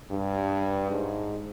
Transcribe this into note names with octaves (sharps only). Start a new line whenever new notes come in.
G2
G#2